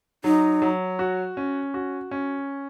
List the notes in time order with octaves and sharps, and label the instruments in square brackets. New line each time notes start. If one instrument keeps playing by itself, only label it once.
[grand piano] F#3 [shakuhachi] D#4
[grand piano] F#3
F#4
C#4
F#4
C#4